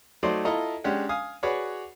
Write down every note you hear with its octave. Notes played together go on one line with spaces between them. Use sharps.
F#3 A3 D#4 C5 D5
E4 F4 A4 D#5 A#5
G#3 C#4 D4 G4 F#5 G5
F5 G#5 D#6
F#4 G#4 B4 C#5 D5